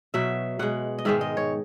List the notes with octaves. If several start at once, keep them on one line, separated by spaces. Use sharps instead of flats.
B2 F#3 E5
B2 G#3 F#5
D#5
G#2 D#3 G#3 E5
D#5
C#5